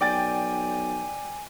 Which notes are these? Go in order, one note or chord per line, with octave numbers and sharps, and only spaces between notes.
B1 D5 G5 G#5 A6